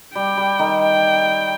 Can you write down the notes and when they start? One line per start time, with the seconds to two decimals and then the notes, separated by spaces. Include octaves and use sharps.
0.15 G3 G5
0.37 G3
0.59 D#3
0.82 G5